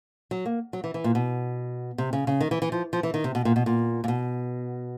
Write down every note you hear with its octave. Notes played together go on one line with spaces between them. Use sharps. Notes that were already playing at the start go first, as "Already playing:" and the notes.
F#3
A#3
F#3
E3
E3
A#2
B2
C3
C#3
C#3
D#3
E3
E3
F3
F3
E3
D#3
C3
B2
A#2
B2
A#2
A#2
B2